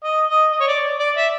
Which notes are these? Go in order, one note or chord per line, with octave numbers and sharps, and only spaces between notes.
D#5
D#5
D#5
C#5
D5
D5
E5